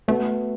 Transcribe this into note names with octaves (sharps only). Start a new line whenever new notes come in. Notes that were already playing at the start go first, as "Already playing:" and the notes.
A3 B3 F#4 B4